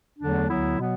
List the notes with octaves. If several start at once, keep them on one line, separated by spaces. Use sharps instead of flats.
E2 D3 F#3 A3 D4
D2 D3 F#3 B3 E4
B2 F#3 B3